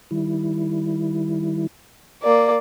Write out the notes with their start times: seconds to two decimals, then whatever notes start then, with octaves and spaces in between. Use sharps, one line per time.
0.11 D#3 G3 E4
2.23 A#3 D5